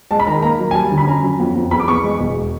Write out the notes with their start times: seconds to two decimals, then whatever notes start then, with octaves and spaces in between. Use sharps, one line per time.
0.11 G#3 A5
0.20 B5
0.27 D#3 A#5
0.43 A#3 A#5
0.59 F#3
0.71 G#5
0.75 G3 A5
0.92 D3
0.98 B5
1.07 C#4 A#5
1.23 F#3
1.40 F2
1.55 F2
1.71 E2 B5
1.80 D6
1.88 E2 C#6
2.04 G#3
2.20 E1